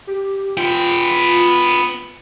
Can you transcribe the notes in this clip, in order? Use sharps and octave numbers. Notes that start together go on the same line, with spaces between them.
G4
B3 F4 G5